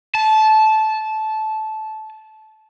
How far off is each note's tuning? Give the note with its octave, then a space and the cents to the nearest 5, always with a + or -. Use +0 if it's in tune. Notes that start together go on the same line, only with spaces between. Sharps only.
A5 -15